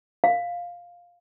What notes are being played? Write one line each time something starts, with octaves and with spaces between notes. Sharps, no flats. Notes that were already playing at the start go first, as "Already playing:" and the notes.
F5